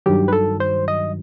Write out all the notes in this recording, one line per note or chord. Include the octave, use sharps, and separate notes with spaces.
G2 D#3 F#3 G4
B4
A4
C5
D#5